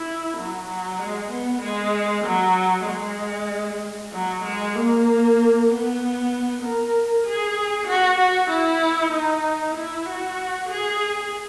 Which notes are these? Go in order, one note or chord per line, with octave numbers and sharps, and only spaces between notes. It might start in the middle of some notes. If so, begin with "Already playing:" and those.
Already playing: E4
F#3
F#3
G#3
B3
G#3
F#3
G#3
F#3
G#3
A#3
B3
A#4
G#4
F#4
F#4
E4
D#4
E4
F#4
G#4